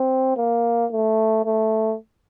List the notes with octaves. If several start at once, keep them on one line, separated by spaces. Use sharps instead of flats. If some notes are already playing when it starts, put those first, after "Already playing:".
Already playing: C4
A#3
A3
A3